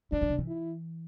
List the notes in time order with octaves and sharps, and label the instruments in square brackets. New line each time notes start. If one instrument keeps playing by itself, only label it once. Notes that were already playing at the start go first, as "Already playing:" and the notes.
[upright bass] E3 [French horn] D4
[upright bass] F3
C3
E3
[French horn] E4